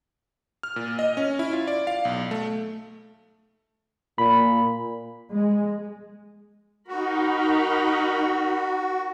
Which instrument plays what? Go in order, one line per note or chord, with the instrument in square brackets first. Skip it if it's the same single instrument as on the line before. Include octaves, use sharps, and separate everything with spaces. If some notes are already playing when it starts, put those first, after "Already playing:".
[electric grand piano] F6
A#2
D#5
C#4
E4
F4
D5
F5
B1
A3
[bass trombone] A#2 [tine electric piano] B5
[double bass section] G#3
[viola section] D#4 A#4 B5 [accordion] F#4